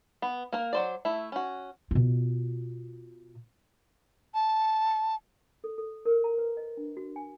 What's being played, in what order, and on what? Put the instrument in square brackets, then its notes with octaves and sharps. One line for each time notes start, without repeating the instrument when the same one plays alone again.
[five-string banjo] B3
A#3 A#4
F#3 C5 D5
A3 E4
C#4 F#4
[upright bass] B2 F4
[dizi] A5
[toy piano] A4
A4
A#4
A#5
B4
D#5
D4
F#4
G#5